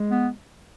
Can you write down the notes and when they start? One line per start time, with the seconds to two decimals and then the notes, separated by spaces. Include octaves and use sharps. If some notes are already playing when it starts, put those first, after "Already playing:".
Already playing: G#3
0.11 B3